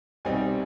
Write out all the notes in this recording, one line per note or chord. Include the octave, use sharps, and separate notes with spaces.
C2 B2 G3 C4 D#4 G#5